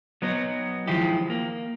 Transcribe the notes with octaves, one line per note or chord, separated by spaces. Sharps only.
F#3 B3 D#4
D#3 F3 G#3 E4 G4
A#3